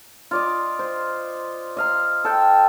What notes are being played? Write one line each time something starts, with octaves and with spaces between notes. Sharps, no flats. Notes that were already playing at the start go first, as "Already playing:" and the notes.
F4 D5 D#5
C5
D#5 F5 A#5
A4 G5